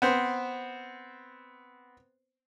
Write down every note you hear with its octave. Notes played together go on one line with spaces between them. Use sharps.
B3 C4 C5